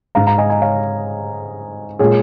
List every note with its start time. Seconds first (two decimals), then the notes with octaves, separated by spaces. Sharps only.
0.15 G#2 G#3 F5 A#5
0.27 F5 A#5
0.38 D#5 G#5
0.50 D#5 G#5
0.61 C#5 F5
1.99 A#2 G#3 G#4 C#5